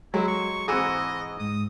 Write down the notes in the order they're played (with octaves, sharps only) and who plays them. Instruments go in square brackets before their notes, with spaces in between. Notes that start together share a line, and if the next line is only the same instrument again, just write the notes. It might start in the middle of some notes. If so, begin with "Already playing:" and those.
[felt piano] F#3 G#3 [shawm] E4
[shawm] C#6
[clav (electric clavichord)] G#2 E3 F#4 [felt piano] C4 G#4 [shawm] D#5
[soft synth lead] G#2 [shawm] D#6